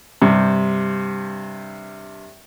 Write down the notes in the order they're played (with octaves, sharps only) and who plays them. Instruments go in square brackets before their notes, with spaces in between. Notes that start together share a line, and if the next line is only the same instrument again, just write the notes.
[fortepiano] G2 C3